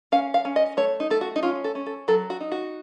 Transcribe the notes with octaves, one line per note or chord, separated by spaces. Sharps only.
C#4 F5
F5
C#4
D#5
A3 C#5
D#4
A3 A4
F#4
D#4
C#4 F4
A4
C#4
A4
F#3 A4
F#4
D#4
F#4